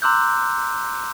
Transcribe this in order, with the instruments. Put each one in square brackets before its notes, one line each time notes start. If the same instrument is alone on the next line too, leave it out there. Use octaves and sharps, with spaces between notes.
[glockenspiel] A#5 C6 D6 E6 F#6 G6